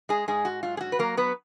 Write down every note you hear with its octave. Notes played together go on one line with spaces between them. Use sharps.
G#3 G#4
G#2 G#3 G#4
F#4
F#3 F4
G#4
F#4
B4
F#3 A#3 A#4
B3 B4